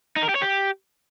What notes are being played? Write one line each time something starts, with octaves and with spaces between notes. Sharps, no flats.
D#4
A#4
G4
C#5
G4